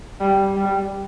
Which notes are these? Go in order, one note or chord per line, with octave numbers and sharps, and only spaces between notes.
G3
G3